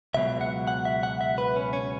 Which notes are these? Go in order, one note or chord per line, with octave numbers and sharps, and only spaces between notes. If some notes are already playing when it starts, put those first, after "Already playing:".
C#2 B2 F#3 E5
F#5
F#5
E5
F#5
E5
B4
C#4
C#4